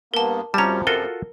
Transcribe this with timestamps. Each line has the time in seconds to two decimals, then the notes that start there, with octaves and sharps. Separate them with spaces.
0.14 G2 A#3 B3 A#4 A5
0.54 F#2 C3 F3 G3 C#4 A5 A#5
0.87 F4 F#4 A4 A#4